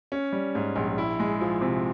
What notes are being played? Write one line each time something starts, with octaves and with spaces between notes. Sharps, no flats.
C#4
G3
G#2
A#1
E4
G#3
F3
C3